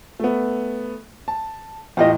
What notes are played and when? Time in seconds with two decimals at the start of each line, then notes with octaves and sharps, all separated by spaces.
0.19 A3 B3
1.28 A5
1.97 E2 A2 F4 G4 D#5